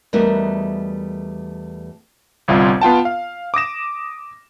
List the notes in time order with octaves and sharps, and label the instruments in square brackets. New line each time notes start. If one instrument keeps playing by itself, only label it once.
[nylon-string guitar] E2 G3 A3 D#4 F#4 A#4
[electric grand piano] G1 C2 C4 F4
B3 F4 G5 A5
F5
D6 D#6 A#6 E7